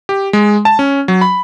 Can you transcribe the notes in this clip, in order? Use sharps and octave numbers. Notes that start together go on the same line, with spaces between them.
G4
G#3
A5
C#4
F#3
B5